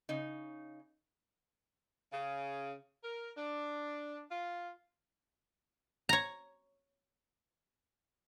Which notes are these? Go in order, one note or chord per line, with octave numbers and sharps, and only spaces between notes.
C#3 D#4
C#3
A#4
D4
F4
C#5 A#5